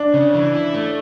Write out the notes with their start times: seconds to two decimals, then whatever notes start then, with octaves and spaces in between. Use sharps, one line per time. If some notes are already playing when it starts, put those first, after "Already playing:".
Already playing: D4
0.14 C#3
0.34 E3
0.54 E4
0.74 A3